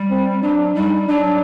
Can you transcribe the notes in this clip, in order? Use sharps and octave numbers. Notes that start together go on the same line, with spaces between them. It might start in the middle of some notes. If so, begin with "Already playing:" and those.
Already playing: G3
C4
F#3 D4
G3 D#4
F#3 D4